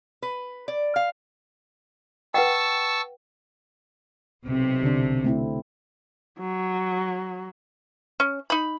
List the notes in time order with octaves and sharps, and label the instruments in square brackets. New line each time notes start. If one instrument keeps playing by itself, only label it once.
[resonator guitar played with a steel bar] B4
D5
F5
[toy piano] B4 F#5 G5 [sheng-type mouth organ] A5 C#6 E6
[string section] B1 C3
[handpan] D3 D4
A3 C4 E4
[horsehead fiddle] F#3
[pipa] C#4
D#4 B5